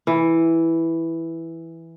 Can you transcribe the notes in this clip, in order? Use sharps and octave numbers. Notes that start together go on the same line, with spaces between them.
E3